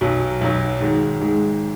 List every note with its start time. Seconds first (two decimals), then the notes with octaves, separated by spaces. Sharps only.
0.01 B1 B2 F#3
0.41 B1 B2 F#3
0.80 G#2 D#3 G#3
1.20 G#2 D#3 G#3